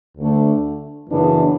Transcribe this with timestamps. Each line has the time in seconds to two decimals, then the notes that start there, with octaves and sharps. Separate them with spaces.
0.18 D2 D3 A3 D4
1.09 F#2 C#3 E3 B3 D4